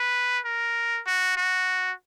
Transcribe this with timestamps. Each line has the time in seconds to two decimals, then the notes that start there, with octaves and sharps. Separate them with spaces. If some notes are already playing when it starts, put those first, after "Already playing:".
Already playing: B4
0.45 A#4
1.06 F#4
1.37 F#4